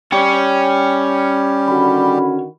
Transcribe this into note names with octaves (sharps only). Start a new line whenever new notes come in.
G3 C#4 G4 C#5 G5
D3 D#3 F#4 B5